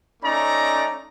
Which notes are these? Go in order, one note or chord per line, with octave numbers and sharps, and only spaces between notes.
A3 C#4 D#4 D5 A#5